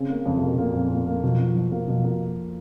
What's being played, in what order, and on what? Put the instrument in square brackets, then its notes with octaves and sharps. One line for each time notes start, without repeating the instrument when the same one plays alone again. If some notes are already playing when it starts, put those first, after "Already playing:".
Already playing: [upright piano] C#3 C4
A#3
[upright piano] F2 [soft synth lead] C#3
[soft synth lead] C3
[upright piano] A#3
[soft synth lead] B2
[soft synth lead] A#2 [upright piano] A#3
[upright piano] F2
A#3
A#3
[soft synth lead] B2 [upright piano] F3
[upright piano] F3
F3
A#3
[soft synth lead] B2 [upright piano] F3
[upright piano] A#3